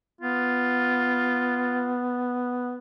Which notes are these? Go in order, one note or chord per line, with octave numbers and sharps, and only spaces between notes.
B3 F4